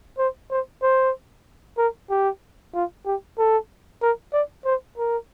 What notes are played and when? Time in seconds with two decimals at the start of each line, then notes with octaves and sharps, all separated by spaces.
0.18 C5
0.51 C5
0.82 C5
1.78 A#4
2.10 G4
2.74 F4
3.06 G4
3.38 A4
4.02 A#4
4.33 D5
4.65 C5
4.98 A#4